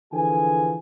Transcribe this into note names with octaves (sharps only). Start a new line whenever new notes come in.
D3 E3 F3 G#4 G#5